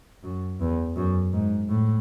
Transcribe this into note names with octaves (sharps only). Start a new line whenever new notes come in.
F#2
E2
F#2
G#2
A2